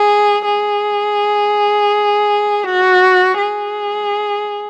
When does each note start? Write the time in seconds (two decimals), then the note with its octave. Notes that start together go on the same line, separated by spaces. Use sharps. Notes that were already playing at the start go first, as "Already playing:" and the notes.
Already playing: G#4
0.45 G#4
2.65 F#4
3.38 G#4